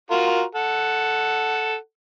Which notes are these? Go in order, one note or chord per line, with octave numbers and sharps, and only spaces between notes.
F4 F#4 A#4
A4 F#5